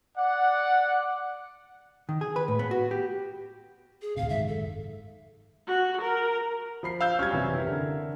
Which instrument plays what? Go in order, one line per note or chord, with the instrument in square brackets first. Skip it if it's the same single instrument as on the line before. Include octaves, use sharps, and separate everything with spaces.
[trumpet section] D5 F#5
[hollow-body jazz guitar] D#3
G#4
B4
A2
B3
F#4
G4
[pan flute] G#4
[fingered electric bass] D2 A2 C3 [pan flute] F5
[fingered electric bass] F#1 G#2 D#3 [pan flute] E5
[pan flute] A4
[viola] F#4
A#4
[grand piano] F3 B5 C7
[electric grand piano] F5 E6 G6
[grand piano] F#2 G3 C#4 [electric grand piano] F6 G#6
[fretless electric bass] C3 E3
[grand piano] E4 A#4
[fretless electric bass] D3